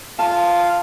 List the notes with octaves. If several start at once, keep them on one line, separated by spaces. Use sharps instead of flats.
F4 F5 A5